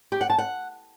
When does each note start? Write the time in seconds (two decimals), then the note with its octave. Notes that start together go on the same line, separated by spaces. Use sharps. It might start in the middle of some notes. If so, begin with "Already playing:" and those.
0.12 G4
0.21 F#5
0.30 A5
0.38 F#5